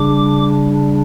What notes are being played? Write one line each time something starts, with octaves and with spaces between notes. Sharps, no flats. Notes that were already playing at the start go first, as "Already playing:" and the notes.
Already playing: C#3 G3 D4 D6